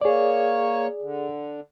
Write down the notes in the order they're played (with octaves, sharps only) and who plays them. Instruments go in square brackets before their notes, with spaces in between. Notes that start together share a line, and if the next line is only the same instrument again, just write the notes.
[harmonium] A#3 C#5 [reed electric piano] G#4 D5
[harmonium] D3